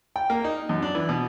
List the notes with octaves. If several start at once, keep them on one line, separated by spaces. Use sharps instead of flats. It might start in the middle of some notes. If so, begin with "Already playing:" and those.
G5
A#3
D#4
F#2
D4
E3
B2